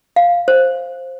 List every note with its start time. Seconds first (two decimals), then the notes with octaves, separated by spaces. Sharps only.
0.16 F5
0.48 C5